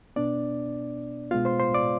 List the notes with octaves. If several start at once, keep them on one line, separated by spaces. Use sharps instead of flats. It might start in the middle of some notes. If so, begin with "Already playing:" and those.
B2 B3 D4 D5
B2 G#3 B3 F4 F5
C5 C6
C5 C6
D5 D6